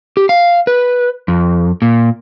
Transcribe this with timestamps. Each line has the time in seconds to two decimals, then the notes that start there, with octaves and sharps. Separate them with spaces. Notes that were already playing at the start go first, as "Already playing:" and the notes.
0.17 G4
0.29 F5
0.67 B4
1.28 F2
1.82 A#2